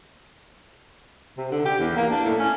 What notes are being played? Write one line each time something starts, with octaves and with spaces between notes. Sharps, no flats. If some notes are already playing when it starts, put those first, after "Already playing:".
C3
D3
G4
E2
A#3
D4
A2
C#4